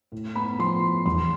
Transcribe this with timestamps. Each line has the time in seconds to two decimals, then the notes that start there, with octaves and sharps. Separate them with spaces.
0.12 A2
0.35 B3 B5
0.59 F3 C6
0.82 A2
1.05 E2 C6